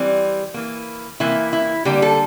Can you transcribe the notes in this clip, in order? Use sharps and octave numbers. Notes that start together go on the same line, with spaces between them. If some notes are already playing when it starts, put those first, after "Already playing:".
Already playing: E3 G3 C4
E3 A#3
C3 E3 A#3 E4
E4
D3 G3 A#3 G4
A4